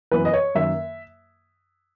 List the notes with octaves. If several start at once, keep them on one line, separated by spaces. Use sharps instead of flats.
F#2 E3 B3 B4
D#5
C#5
F#2 D#3 A#3 E5